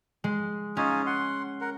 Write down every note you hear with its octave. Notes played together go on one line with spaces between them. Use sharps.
G#3
C#4 D#4 F4 G#4
F#5 C6
A#4 F#5